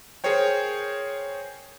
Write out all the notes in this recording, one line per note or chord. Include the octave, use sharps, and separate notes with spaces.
G#4 A#4 C5 C#5 G5